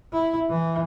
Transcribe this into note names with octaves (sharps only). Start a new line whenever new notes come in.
E4
E3